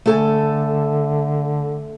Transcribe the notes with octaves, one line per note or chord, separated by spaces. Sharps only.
D3 A3 A4 G#5